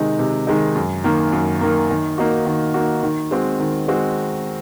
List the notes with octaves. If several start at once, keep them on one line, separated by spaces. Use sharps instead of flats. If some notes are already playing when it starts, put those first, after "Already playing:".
Already playing: C3 D#3 G#3 D#4
C3
D#3 G#3 D#4
F#2
D#3 A#3
F#2
D#3 A#3
D#3
A#3 D#4 F#4
D#3
A#3 D#4 F#4
D#3
G#3 C4 F#4
D#3
G#3 C4 F#4